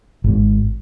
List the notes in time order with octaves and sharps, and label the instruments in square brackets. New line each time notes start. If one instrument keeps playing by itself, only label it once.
[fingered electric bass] G#1 G#2